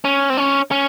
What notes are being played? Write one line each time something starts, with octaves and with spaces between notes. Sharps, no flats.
C#4
C4
C#4
C#4